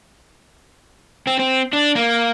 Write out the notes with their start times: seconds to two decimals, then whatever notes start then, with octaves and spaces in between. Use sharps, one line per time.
1.27 C4
1.39 C4
1.73 D4
1.95 A#3